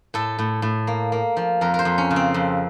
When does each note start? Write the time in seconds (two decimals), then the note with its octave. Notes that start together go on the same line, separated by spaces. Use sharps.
0.14 A2 A4
0.39 A2
0.62 A2
0.87 A#3
1.12 A#3
1.37 F3
1.61 F2 A#4
1.74 A#4
1.79 C5
1.85 F2
1.98 C#4
2.11 C#3
2.16 C4
2.34 F2